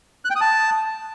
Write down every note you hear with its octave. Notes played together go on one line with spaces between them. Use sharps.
F#6
G5
D#6
A5